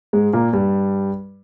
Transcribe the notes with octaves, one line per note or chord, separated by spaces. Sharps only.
G#2 G#3
A#2 A#3
G2 G3